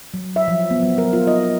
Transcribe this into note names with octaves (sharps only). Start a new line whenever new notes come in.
F#3
E5
F3
B3
F#3
A#4
F4
D#5